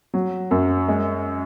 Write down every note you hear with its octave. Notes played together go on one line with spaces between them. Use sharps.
F#3
F#2
G#3